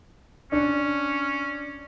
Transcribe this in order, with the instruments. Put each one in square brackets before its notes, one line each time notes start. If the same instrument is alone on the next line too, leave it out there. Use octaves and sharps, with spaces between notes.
[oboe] C#4 [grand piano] D4